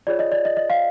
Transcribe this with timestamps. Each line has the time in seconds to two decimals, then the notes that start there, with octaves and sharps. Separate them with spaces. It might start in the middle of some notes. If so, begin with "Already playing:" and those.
0.07 F4 G#4 C#5 D5
0.19 D#5
0.32 D5
0.45 D#5
0.57 D#5
0.70 F5